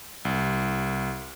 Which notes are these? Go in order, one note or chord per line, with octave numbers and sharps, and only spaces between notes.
C2